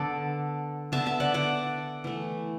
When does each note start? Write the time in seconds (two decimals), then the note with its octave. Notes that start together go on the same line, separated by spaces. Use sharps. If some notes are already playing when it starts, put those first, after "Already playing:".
Already playing: D3 B3 A4 D5
0.92 D3 B3 E5 A5
1.06 E5 A5
1.20 D5 F#5
1.34 D5 F#5
2.04 E3 A3